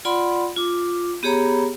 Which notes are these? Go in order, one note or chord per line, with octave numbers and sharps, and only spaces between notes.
F4 D5 F#5 B5 C6
F4 D6
B3 G4 G#4 C#5 A#5 B5